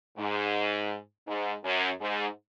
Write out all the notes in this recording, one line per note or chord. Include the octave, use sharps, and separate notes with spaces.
G#2
G#2
F#2
G#2